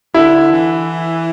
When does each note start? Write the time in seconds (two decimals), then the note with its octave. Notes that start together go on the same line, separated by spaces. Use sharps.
0.14 D3 E4
0.52 E3